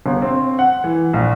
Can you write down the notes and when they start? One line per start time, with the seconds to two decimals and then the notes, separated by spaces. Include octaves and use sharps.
0.06 G1
0.22 C4
0.59 F#5
0.84 E3
1.13 A#1